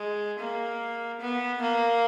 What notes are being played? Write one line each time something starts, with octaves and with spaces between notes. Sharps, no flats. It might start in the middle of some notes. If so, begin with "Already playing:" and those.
Already playing: G#3
A#3
B3
A#3